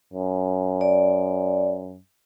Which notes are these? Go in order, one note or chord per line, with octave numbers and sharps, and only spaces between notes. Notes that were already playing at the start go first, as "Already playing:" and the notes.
F#2
D5